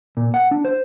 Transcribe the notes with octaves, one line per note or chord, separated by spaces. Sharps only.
A#2
F#5
D4
C5